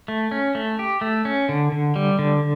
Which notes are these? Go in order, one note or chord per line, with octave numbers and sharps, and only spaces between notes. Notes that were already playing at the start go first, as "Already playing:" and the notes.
A3
C#4
A3
G4
A3
C#4
D3
D3
G3
D3